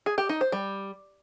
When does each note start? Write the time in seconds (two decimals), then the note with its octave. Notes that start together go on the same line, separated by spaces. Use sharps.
0.06 G#4
0.18 G4
0.29 D#4
0.41 C5
0.52 G3